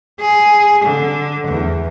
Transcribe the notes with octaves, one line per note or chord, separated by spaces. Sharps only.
G#4
D3
E2